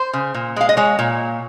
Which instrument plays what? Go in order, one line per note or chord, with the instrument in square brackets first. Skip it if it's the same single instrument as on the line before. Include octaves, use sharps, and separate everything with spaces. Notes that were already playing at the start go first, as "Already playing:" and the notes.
Already playing: [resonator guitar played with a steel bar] C5
C#3
A#2
G#3 F5
D#5
G#3 C#5
A#2